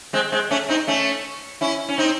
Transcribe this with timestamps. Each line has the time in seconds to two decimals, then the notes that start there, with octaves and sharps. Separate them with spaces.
0.13 G#3 C4
0.32 G#3 C4
0.51 A3 C#4
0.69 C4 D#4
0.87 A3 C#4
1.61 C#4 E4
1.89 C#4
1.98 C4 D#4